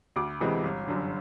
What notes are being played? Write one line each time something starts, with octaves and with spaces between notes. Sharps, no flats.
D2 D6
C3 E3 G#3 C4
G1
F#2 D3